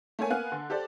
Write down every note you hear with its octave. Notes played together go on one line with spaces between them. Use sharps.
A3 A#3 C#5 G#5
A#3 B3 F5 G#5 F#6
D3
G4 A4 C5 D5